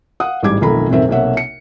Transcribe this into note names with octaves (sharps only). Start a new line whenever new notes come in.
F5 F#5 D#6
A1 G#2 G3 D6 G#6
B1 F2 D#3 A3 A#5 B5
D#1 F#2 C3 D#3 C4 E5
B1 C3 A#3 C#5 E5 F#5
C#7